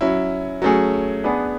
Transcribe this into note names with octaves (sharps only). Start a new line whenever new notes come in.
F#3 C#4 E4
F#3 A3 C#4 G#4
B3 D4 G#4 B4